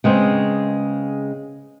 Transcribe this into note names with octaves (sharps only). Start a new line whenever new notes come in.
C#3 G#3 B3 C4